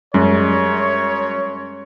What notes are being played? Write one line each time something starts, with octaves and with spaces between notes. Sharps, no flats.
F#2 G3 G#3 C#4 C#5